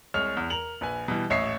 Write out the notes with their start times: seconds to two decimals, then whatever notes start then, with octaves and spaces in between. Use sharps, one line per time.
0.14 C2 G#3 C#5 F6 F7
0.37 E2
0.50 A#4 F7 F#7
0.81 A#1 B4 G#5
1.08 B2 E3 G3
1.30 D#1 A1 C#5 D#5 E5 C7